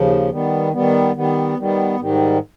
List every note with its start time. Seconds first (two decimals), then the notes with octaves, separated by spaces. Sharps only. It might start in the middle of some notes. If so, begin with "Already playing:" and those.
Already playing: D#2 C#3 F3
0.31 D#3 G3 B3
0.73 D#3 G3 B3
1.15 D#3 G3 B3
1.57 D#3 G3 B3
2.00 G#2 D#3 G3